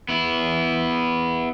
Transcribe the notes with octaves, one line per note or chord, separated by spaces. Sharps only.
B3 E4